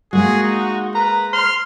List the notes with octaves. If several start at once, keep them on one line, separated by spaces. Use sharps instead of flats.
G#3 A#3 F#4 G#4
D#4
B4 A#5
C6 F6